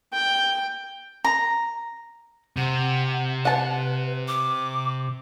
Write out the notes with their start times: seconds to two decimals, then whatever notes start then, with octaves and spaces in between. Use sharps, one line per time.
0.13 G5
1.25 A#5
2.57 C3 F#5
3.45 B4 F#5 A5
4.28 D6